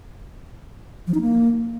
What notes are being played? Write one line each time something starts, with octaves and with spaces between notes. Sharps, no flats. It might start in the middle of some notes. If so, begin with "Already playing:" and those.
F3
D#4
A#3